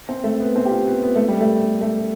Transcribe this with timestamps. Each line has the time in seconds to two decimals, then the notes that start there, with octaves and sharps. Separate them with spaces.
0.09 C4
0.24 A3
0.40 B3
0.56 C4
0.65 G4
0.71 F4
0.87 B3
1.03 B3
1.16 A3
1.28 G3
1.41 A3
1.81 A3